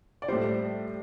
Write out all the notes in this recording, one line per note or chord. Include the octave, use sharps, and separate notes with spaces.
D5
A2 G3 C5